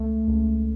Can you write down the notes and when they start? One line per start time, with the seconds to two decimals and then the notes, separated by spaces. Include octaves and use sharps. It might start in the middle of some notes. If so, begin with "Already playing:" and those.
Already playing: C#2 A3
0.28 C#2